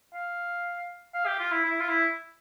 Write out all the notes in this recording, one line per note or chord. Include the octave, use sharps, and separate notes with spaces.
F5
F5
G4
F4
E4
E4
F4
E4